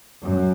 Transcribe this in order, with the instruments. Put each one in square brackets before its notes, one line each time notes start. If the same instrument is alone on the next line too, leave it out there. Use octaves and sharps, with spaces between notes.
[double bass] F#2